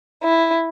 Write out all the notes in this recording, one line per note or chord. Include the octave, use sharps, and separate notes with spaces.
E4